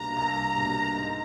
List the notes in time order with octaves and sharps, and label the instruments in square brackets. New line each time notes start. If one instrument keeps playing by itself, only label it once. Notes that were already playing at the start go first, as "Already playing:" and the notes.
Already playing: [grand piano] C2 B2 G3 A#3 D4 [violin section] A#5
[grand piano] C2
B2 G3 A#3 D4
G#2